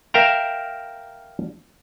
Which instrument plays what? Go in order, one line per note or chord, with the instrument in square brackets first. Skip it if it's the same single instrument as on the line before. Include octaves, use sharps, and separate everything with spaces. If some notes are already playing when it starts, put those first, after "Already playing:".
[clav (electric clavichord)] A#4 E5 F5 G5 A#5